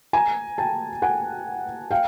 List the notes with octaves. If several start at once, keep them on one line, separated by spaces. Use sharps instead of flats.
G#5 A#5
G5 A5
F#5 G#5
F5 G5